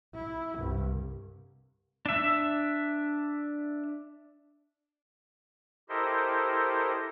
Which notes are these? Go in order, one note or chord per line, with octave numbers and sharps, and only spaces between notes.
E4
C2 G2
D4 E5
E4 G4 A4 A#4 C5 D#5